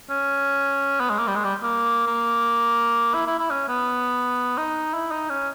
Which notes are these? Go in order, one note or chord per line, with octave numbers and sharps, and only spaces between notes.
C#4
B3
G#3
A#3
G3
G#3
G3
A#3
A#3
E4
E4
E4
C#4
B3
D#4
E4
D#4
C#4